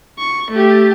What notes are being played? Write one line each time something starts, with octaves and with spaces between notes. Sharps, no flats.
C#6
A3 G4